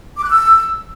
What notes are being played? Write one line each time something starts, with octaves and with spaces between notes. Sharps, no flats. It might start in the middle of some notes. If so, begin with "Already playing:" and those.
D6
F#6
E6